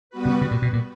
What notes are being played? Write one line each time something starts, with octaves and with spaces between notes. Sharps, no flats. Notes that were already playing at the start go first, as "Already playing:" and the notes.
G3 B3 F#4 B4
C#3
C#3
A#2
B2
A#2